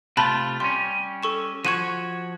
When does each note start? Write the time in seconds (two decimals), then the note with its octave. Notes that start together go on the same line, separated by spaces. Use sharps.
0.17 C3 A3 F4 A5 B5 F#6
0.60 G3 C#4 C6
1.23 A4 C#6 E7
1.65 F3 F#4 C#5 C#6 D#7